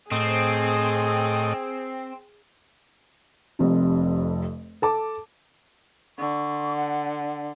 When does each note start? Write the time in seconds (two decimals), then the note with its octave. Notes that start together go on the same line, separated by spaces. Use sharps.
0.11 A2 C4 G#4 D#5
3.59 F1 F2 C3
4.82 A4 A5 D6
6.18 D3 C#6
6.77 F#5